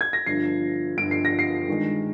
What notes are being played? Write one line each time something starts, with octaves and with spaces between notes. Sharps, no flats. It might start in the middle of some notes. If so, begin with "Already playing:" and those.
G#6
A#6
G1 G2 F3 C7
G1 G2 F3 D7
C7
A#6
C7
G2 D#3 G#3